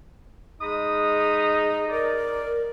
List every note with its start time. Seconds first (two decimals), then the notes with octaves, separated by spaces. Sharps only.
0.62 G#3 D#4 G#4 B5 D#6
1.90 A#4 D5